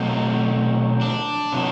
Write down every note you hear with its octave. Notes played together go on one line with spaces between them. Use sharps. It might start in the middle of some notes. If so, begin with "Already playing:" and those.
Already playing: B2 F#3 A3 C4
D4
C3 F#3 B3